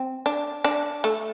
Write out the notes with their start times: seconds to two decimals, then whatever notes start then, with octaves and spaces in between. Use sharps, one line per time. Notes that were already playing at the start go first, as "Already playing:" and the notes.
Already playing: C4
0.26 D4
0.64 D4
1.04 A3